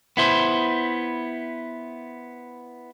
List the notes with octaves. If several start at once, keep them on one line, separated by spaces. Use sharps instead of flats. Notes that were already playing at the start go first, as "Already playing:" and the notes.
B3 E4 C5